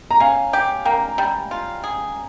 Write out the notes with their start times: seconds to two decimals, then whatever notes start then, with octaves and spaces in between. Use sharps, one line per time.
0.11 A#5
0.20 C#4 F5 G#5
0.53 G4
0.85 A#3 G5 A#5
1.18 G3
1.51 F4
1.84 G#4